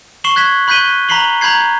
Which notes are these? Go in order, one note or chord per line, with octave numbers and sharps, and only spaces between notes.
C#6 C7 E7 F#7 G7
F#6 G#6 B6 E7
B5 F#6 G6 B6 D#7 G7
A#5 B5 B6 C7 F#7 G7
A#5 B5 G6 G#6 C7